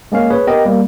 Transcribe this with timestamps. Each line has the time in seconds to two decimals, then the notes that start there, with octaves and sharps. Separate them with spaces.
0.12 G#3 A#3 C#4 F5
0.30 G#4 B4 C#5
0.47 B3 G4 A#4 D#5 G5
0.65 G3 A#3